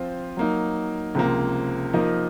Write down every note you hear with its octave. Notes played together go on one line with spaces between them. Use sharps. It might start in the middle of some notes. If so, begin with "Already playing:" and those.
Already playing: F3 C4 F4 C5
F#3 A#3 D#4
C#2 C3 F3 A#3
F3 A#3 D#4 A#4 D#5